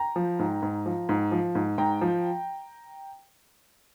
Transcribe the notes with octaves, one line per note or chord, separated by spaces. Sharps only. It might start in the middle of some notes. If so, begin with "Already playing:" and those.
Already playing: G5 A#5
F3
G#2
G#2
F3
G#2
F3
G#2
G#2 G5 A#5
F3